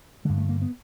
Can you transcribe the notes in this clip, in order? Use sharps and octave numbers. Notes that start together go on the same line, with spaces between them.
G2 D3 G#3
A3
A#3
B3